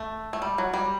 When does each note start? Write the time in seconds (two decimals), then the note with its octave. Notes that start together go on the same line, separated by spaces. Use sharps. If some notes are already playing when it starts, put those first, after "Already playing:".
Already playing: A3
0.33 A3
0.42 G3
0.58 F#3
0.74 G3